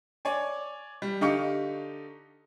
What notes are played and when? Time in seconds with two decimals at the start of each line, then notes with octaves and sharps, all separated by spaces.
0.25 C#5 D5 G#5
1.02 G3
1.21 D3 D#4 G4 F5 C#6 C#7